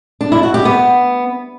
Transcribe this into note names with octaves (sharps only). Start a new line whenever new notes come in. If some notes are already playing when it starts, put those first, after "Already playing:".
D4
E4
F#4
G4
B3